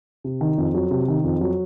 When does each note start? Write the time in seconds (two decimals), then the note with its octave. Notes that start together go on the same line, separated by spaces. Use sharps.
0.24 C3
0.41 D#3
0.58 F2
0.74 F#3
0.91 C3
1.08 D#3
1.24 F2
1.41 F#3